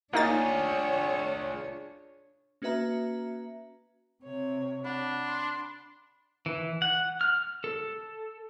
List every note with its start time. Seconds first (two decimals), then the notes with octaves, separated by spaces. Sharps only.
0.13 A#3 D4 D#4 F4 G#4 C#5 A6
2.62 A#3 C#4 F#4 B4 E5 A#5
4.22 C3 C#5
4.84 D4 F#5 B5
5.24 C6
6.46 E3
6.82 F#5
7.21 F6
7.64 A4